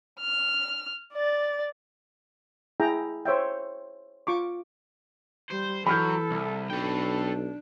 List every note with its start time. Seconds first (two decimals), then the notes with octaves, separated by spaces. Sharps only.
0.20 F6
1.13 D5 A6
2.80 E4 G#4 G5 A#5
3.26 C5 C#5 E5 G5
4.27 F4 C#6 D6
5.51 G3 C5
5.86 E3 F#3 A4 B5 F6 G6
6.31 C2
6.70 B1 D4 A4 G5